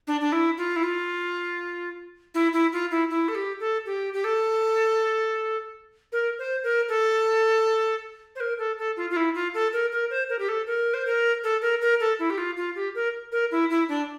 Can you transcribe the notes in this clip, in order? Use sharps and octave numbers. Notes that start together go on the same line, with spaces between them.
D4
D4
E4
F4
E4
F4
E4
E4
F4
E4
E4
A4
G4
A4
G4
G4
A4
A#4
C5
A#4
A4
C5
A#4
A4
A4
F4
F4
E4
F4
A4
A#4
A#4
C5
A#4
G4
A4
A#4
C5
A#4
A4
A#4
A#4
A4
E4
G4
F4
F4
G4
A#4
A#4
E4
E4
D4